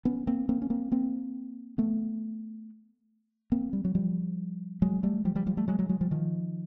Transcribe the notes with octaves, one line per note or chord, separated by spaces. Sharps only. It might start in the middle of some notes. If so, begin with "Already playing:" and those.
B3 C#4
A#3 C4
A#3 C4
C#4
A#3 C4
A#3 C4
A3 B3
A#3 C4
G3
F#3
F3 G3
F#3 G#3
G3 A3
F3 G3
F3 G3
F3 G3
G3 A3
F#3 G#3
F#3 G#3
F#3 G#3
F3 G3
D#3 F3